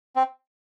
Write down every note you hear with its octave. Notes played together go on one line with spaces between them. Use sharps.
C4